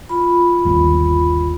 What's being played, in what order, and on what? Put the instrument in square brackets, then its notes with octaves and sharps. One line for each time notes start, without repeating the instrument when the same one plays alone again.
[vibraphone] F4 B5
[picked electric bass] G1 D#2